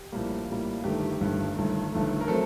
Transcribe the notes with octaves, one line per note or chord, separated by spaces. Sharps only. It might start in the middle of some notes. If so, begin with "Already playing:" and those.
Already playing: G4
A#1 A2 G3 A#3
A#1 A2 G3 A#3
G1 G2 D#3 A3 G4
G1 G2 D#3 A3
G1 G2 D#3 A3
G1 G2 D#3 A3
A#4
F#3 A3 C4 A4